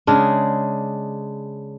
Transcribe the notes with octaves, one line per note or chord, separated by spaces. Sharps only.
C#3 G#3 D4